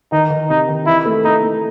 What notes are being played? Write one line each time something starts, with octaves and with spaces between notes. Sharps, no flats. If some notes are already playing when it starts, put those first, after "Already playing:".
D#3 D#4
D#3
C3 D#4
D#3
E3 E4
A3
A3 D#4
A3